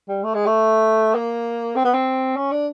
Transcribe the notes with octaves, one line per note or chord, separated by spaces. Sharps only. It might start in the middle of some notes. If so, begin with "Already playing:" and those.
G3
A3
G#3
A3
A#3
C4
B3
C4
C#4
D4